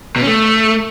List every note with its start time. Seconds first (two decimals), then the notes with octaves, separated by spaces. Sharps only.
0.16 B2
0.21 C#4
0.27 A3